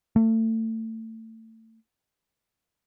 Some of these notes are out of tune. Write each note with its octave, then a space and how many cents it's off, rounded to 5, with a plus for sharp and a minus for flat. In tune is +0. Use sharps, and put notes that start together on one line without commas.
A3 +30